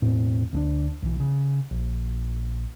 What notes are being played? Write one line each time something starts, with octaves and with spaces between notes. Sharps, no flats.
E1 A2 C4
D2 G#3 D4
B1 E3
C#3
A#1